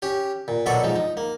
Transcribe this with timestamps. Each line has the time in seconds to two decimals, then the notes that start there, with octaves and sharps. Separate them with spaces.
0.02 C#4 G4
0.48 A#2
0.66 B2 F#3 A4 D5 B5 C#6
0.84 F3 G#3 D#4
0.96 D#4
1.17 A#3